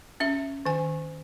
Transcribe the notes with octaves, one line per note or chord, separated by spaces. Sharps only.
C#4 E5
D#3 G#5